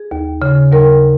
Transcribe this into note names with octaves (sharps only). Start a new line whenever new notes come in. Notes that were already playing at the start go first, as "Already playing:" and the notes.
Already playing: G#4
D#2
C#3
D#2 A#4